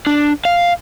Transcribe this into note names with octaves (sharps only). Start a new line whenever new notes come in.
D4
F5